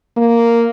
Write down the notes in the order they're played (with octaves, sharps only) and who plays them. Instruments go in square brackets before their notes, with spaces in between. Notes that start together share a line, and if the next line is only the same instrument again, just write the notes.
[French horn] A#3